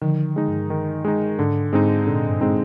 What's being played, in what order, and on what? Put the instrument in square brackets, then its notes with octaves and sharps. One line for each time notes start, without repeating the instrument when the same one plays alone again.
[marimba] D3 F3 [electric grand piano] D#3
[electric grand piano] G#3 D#4
[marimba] G2
[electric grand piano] D#3
G#3 D#4
[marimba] G#2 [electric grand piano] D3
[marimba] G#2 [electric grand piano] G#3 C4 D#4
[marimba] A#2 [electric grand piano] D3
[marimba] G2
[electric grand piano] G#3 C4 D#4